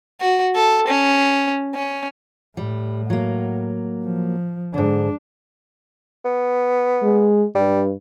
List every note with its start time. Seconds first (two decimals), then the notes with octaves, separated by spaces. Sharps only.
0.21 F#4
0.55 A4
0.88 C#4
1.75 C#4
2.57 A2 G3
3.10 F#3 A#3
4.04 F3
4.74 G#2 D3 D4
6.25 B3
7.03 G#3
7.55 G2 G3